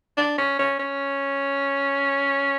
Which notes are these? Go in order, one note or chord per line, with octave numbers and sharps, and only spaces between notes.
D4
C#4
C#4
C#4